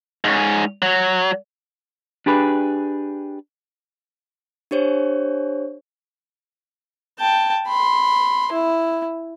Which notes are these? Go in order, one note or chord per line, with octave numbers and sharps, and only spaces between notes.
G#2 C#4
F#3
D4 G4 G#4 B4
D4 G4 C5 C#5
G5 A5
B5 C6
E4